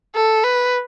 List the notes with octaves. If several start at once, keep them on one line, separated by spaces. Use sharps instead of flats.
A4
B4